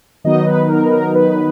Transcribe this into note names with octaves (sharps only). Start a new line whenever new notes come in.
D#3 F#3 B3 D#4 D#5
B4
A#4
B4
A#4
B4